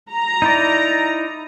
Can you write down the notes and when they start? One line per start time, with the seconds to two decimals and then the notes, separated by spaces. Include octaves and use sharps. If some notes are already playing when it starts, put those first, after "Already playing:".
0.13 A#5
0.42 D#4 E4 D5